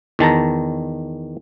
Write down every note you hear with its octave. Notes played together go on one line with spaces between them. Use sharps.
E2 D#3 A5 A#5